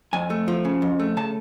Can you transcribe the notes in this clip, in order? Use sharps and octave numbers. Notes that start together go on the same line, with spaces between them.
F2 G#5
A3
F3
C#3
F2
A3
C#3 A5